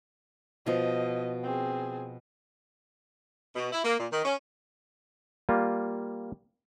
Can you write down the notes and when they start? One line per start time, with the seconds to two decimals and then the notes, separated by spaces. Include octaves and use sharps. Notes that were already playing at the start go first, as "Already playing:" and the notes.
0.66 B2 F3 D#5
1.43 C4 G#4
3.55 B2
3.72 E4
3.84 A#3
3.99 A#2
4.11 D#3
4.24 C#4
5.49 G3 A#3 F4